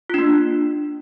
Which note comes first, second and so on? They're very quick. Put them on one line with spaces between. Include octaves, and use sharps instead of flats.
F4 D4 A#3